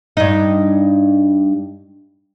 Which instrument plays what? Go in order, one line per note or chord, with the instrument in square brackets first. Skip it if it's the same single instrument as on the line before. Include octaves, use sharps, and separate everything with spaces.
[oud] G2 D#4